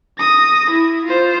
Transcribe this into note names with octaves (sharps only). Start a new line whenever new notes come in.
D#6 A#6
E4
F4 C5